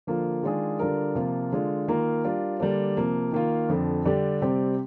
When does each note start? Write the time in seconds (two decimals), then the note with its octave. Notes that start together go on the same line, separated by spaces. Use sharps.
0.07 D3 F3 A#3 F4
0.43 D#3 G#3 D4 F4 G#4
0.79 D3 G3 D4 F4 A#4
1.15 C3 F3 A#3 F4
1.52 D3 G#3 D4 F4
1.87 D#3 A#3 F4 A#4
2.24 G3 D4 F4 A#4
2.60 D3 G3 A#3 D4
2.97 C3 F3 A#3
3.32 D#3 A#3 F4
3.68 F2 D3 F3
4.05 D3 G3 D4 G4
4.41 C3 G3 C4 G4